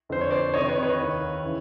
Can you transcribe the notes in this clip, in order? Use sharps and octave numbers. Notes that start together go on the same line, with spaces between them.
F2 D3 C5
C#5
C5 D5
F2 C3 D#3 C#5 D#5
B4 C#5
B4 C#5
D#2 D#3
C#3 E3